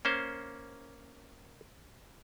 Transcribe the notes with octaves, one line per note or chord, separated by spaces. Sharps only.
A#3 C#4 C5